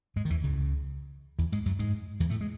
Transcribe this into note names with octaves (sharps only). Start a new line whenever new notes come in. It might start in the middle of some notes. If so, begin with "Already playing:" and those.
G#2 G#3
D#3
E2 E3
C#2 C#3
E2 E3
G#2 G#3
F#2 F#3
G#2 G#3
E2 E3
A2 A3
G#3